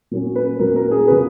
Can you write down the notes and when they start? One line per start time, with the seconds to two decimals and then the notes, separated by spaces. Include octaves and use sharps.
0.11 A#2 F#3 C#4
0.36 B4
0.59 A#2 F#3 C#4 A#4
0.76 A#4
0.91 G#4
1.07 C#3 F#3 B3 B4